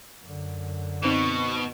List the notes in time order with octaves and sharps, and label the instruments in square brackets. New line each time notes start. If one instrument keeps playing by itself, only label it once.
[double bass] F#2 D3
[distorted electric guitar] B2 [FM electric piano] C4 D#4 [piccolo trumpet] C#6